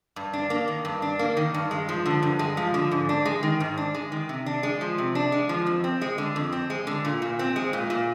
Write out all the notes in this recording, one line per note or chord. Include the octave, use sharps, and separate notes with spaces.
G2
D4
A#3
D#3
G2
D4
A#3
D#3
G2
G#3
F3
D3
G2
G#3
F3
D3
G#2
D4
G#3
D#3
G#2
D4
G#3
D#3
C3
D4
G#3
F3
C3
D4
G#3
F3
F2
C4
G#3
D3
F2
C4
G#3
D3
A#2
A#2
C4
G#3
A#2
A#2